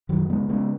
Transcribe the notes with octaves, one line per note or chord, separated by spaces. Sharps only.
F#2 D#3 F#3
C#3 G#3 B3
C#3 G#3 B3